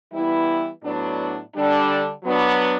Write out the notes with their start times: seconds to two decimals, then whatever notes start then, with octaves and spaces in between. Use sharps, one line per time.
0.12 E3 G3 B3 E4
0.83 A2 F#3 B3 D4
1.54 D3 G3 D4
2.24 F#3 B3 D4